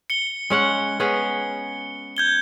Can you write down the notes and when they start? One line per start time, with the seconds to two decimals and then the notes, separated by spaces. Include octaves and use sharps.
0.10 C#7 G7
0.50 G#3 C#4 F#5
1.00 B3 C#4 G#4
2.17 G6 G#6 G7